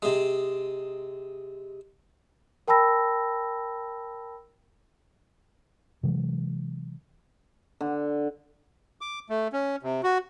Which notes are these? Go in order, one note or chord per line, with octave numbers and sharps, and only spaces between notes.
C3 G#3
A#4 G5 A5 B5 E6 A#6
C3 E3 F#3 G#3
D3
D6
A3
C#4
C3
F#4